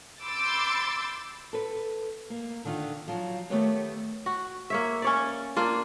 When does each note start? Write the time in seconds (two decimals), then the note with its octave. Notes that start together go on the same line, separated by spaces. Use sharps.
0.20 B5 C6 D6 E6 G6 A6
1.53 A4 B4
2.30 A#3
2.65 D3 D#3 D4 F4
3.08 F3 F#3
3.50 D#3 A3 B3 G4 B4 C#5
4.26 F#4
4.70 A#3 C#5 E5
5.02 C#4 C#5 D5
5.56 A#3 D4 F4